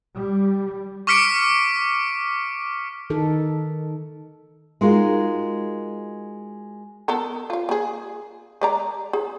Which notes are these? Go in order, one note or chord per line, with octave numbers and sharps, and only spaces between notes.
G3
C#6 D6 F6 B6 C#7 D7
D#3 D#4 A4
G#3 D#4 F4 F#4 A#4
B3 A4 A#4
F4 F5
A#3 G#4
G#3 D5 A#5
G#4